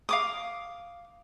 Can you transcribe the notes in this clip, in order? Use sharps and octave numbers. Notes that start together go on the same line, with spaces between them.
F5 D6 D#6